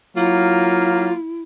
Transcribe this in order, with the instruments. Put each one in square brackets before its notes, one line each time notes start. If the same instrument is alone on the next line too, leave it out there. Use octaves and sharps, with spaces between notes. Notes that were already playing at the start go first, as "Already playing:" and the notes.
[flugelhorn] F#3 [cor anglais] A#3 [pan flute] E4 [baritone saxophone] F4